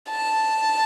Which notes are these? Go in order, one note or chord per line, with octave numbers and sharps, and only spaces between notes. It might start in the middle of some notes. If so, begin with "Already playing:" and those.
A5